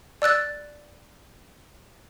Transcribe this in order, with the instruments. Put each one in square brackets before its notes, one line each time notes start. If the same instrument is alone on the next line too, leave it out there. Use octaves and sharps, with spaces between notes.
[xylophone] D5 E6 F#6 A6